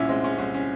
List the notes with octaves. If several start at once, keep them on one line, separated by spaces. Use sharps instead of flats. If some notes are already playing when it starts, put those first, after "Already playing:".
Already playing: C2 A#2 C#4 E4
G#3 C4
C#4
C2 C#4
C#4